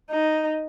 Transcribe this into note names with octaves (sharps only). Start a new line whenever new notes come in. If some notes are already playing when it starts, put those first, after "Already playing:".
D#4